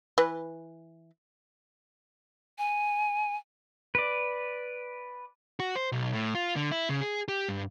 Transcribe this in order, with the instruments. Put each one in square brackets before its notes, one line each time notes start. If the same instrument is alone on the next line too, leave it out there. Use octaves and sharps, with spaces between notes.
[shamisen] E3 B4
[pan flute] G#5
[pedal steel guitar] B4 D5
[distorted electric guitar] F#4
C5
B1
A2
F4
D3
E4
C#3
G#4
G4
G2